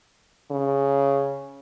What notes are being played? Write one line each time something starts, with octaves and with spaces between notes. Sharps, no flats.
C#3